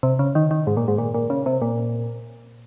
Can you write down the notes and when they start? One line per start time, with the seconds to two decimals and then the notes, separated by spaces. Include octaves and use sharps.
0.03 C3
0.19 C#3
0.35 D#3
0.51 D#3
0.67 G#2
0.77 A#2
0.88 G#2
0.98 A#2
1.14 A#2
1.30 C#3
1.46 C3
1.62 A#2